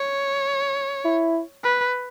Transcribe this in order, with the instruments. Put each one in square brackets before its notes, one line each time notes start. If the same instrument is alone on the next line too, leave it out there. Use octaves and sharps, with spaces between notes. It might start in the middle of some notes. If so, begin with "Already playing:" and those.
Already playing: [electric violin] C#5
[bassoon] E4
[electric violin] B4